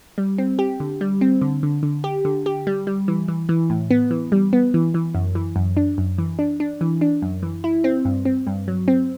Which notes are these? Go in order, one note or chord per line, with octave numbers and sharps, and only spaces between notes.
G3
C4
G4
D3
G3
C4
D3
D3
D3
G4
D3
G4
G3
G3
E3
E3
E3
A2
B3
E3
G3
B3
E3
E3
F#2
E3
F#2
D4
F#2
E3
D4
D4
E3
D4
F#2
E3
E4
C4
G2
C4
G2
F#3
C4